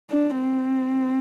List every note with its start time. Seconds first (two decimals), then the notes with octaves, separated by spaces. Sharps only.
0.11 D4
0.40 C4